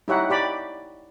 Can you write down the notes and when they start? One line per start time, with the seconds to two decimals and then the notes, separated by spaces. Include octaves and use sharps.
0.08 D#4 E4 G4 C#5 E5 F#5
0.30 G4 D5 B5